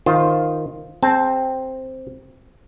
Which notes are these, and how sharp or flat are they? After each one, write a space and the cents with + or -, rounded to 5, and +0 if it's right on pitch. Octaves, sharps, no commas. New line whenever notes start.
D#3 +0 F4 +0 C5 +0
C4 +0 G#4 +0 A5 -20